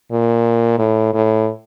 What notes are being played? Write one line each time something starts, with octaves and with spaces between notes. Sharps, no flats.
A#2
A2
A2